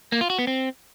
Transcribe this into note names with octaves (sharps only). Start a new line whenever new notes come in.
A#3
F4
F#4
B3
C4